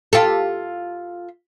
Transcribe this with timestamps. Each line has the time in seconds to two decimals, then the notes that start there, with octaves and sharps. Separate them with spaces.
0.13 F4 G4 A4